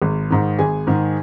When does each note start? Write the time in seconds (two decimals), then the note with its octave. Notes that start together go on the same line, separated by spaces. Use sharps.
0.02 G#1
0.30 G#2 D#3
0.59 G#1 G#4 G#5
0.87 G#2 D#3